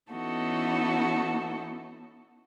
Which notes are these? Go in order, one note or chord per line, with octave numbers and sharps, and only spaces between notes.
E3 B3 C#4 D#4 F#4 A4